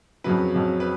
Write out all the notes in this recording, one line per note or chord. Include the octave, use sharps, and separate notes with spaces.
F2 C#3 F#3 B4
F2 C#3 F#3
B4